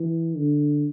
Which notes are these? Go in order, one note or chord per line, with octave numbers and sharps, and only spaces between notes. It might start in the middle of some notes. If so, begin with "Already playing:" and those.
Already playing: E3
D3